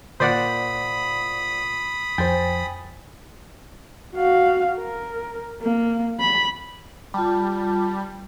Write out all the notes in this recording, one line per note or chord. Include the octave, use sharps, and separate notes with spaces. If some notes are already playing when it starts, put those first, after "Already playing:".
A#2 C5 D5 F#5 B5 D#6
F2 C5 G5 G#5 A6
F#4 F5
A#4
A#3
B5
G3 F4 A5